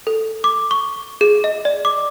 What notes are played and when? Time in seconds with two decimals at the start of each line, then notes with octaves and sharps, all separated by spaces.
0.07 A4
0.44 D6
0.71 C#6
1.21 G#4
1.44 D#5
1.65 D5
1.85 D6